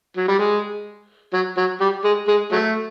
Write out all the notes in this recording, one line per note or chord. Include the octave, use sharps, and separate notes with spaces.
F#3
G3
G#3
F#3
F#3
G3
G#3
G#3
F#3 A3